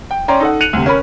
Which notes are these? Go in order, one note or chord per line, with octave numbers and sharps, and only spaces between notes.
G5
C#4 D5 G5 A#5 C6
D#4 A4 F#5
F#6 C#7 D#7 F7 F#7
D2 C3
C#4 A#4 B5